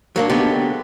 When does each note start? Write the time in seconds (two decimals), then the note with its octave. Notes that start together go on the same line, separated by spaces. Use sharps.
0.16 F#3 A#3 D4
0.29 D3 F#3 G#3 B3 D#4 G4